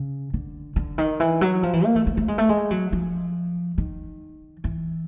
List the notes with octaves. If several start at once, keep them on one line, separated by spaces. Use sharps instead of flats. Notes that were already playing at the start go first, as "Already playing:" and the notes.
Already playing: C#3
D3
D3
D#3
E3
F#3
F3
E3
A#3
A3
A3
A3
G#3
A3
G#3
F#3
F3
D#3
E3